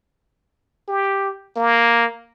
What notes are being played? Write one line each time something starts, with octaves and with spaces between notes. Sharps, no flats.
G4
A#3